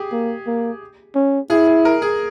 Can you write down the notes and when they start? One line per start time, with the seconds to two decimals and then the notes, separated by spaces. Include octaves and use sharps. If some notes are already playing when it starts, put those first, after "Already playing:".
Already playing: G4 G#4
0.12 A#3
0.47 A#3
1.15 C#4
1.50 E4 G#4
1.67 G#4
1.85 A#4
2.02 G#4